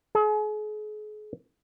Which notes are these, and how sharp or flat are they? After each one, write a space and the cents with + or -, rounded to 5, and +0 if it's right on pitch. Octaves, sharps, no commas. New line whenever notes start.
G#4 +40